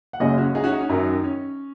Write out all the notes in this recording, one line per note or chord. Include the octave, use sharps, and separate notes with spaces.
F#5
F#1 F#2 C#3 G#3 D#5 G#5
C#4 F#4
D#4 G#4
C#4 F#4
D#4
C#4
F#2 D#3 F#3 D#4
C#4